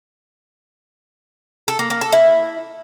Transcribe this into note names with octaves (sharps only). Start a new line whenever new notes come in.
A4
A#3
A#3
A4
E4